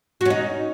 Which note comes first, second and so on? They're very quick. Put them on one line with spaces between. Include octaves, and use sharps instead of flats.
F#4 C#4 D#4